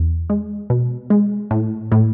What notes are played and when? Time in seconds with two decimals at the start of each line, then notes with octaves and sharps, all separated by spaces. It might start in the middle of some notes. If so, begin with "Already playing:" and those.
Already playing: E2
0.30 G#3
0.70 B2
1.10 G#3
1.51 A2
1.92 A2